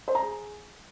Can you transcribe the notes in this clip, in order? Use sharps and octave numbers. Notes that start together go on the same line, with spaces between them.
C5
A#5
G#4